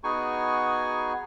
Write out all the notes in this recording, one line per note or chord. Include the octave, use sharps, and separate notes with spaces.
B3 D#4 F#4 G#4 G#5 C#6